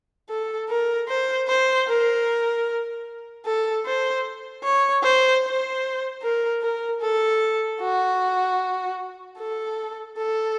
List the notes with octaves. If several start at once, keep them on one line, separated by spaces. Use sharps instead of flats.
A4
A#4
C5
C5
A#4
A4
C5
C#5
C5
C5
A#4
A#4
A4
F#4
A4
A4